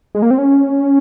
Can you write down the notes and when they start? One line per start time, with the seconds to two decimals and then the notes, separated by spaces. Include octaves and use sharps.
0.15 G#3
0.22 A#3
0.31 C4
0.38 C#4